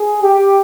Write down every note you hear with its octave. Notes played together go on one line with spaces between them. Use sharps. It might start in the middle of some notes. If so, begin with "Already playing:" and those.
Already playing: G#4
G4